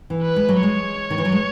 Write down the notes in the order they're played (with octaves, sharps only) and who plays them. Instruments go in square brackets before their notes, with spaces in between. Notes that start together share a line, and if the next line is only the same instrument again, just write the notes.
[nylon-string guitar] E3
[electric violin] B4
[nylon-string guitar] G#3
F#3
[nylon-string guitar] G#3 [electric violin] C#5
[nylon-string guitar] D#3
E3
F#3
G#3